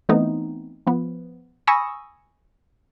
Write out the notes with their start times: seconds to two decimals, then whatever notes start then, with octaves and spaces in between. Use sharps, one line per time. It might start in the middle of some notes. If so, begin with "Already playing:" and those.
0.09 E3 A3 B3 C4 D#4
0.87 F3 B3
1.67 G#5 B5 C#6 D#6 E6 A#6